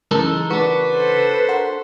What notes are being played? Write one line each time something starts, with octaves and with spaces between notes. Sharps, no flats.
C#3 E3 G#3 D#4 A4 A#4
D4 F#4 B4
A4 C5
A#4 F#5 C6